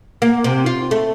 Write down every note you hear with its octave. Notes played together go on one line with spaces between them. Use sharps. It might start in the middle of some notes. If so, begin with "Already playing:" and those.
A#3
C3
F4
A3